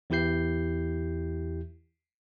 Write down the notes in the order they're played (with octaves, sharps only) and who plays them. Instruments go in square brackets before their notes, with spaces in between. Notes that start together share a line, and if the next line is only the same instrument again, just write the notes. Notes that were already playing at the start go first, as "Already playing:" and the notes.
[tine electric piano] E2 E3 E4 G4 G6 C7